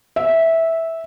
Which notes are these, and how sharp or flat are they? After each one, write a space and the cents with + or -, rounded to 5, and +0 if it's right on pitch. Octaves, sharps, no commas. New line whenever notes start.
E5 -10